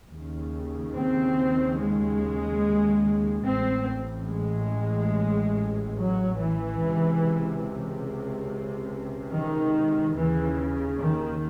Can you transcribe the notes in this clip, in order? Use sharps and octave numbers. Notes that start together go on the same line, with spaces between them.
D#2 C#3
C4
G#3
A1 A2 C4
G#3
F#3
E3
C#2 C3
D#3
D#2 C#3 E3
D#3